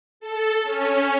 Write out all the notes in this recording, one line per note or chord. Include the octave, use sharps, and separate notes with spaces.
A4
C#4